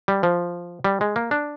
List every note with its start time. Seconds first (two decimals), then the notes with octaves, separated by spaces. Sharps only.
0.08 G3
0.23 F3
0.84 G3
1.01 G#3
1.16 A#3
1.31 D4